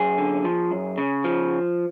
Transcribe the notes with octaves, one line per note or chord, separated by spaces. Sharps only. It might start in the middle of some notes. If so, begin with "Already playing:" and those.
Already playing: F#2 G#4
D3
F3
F#2
C#3
F3